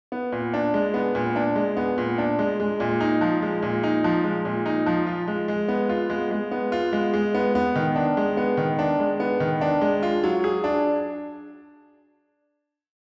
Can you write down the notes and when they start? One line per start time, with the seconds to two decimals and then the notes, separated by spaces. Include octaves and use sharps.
0.12 B3
0.32 A#2
0.54 D4
0.74 G#3
0.94 B3
1.15 A#2
1.36 D4
1.56 G#3
1.77 B3
1.98 A#2
2.18 D4
2.39 G#3
2.60 G#3
2.80 A#2
3.00 D#4
3.21 F3
3.42 G#3
3.62 A#2
3.83 D#4
4.04 F3
4.24 G#3
4.45 A#2
4.66 D#4
4.86 F3
5.07 F4
5.28 G#3
5.48 G#3
5.68 B3
5.89 F4
6.10 G#3
6.31 G#3
6.51 B3
6.72 F4
6.93 G#3
7.13 G#3
7.34 B3
7.55 B3
7.76 D#3
7.96 D4
8.17 G#3
8.37 B3
8.57 D#3
8.79 D4
9.00 G#3
9.20 B3
9.40 D#3
9.61 D4
9.81 G#3
10.03 F4
10.24 F#3
10.44 G#4
10.64 D4